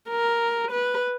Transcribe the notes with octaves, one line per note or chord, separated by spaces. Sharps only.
A#4
B4